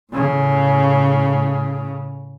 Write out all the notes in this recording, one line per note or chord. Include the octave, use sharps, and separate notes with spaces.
A2 C#3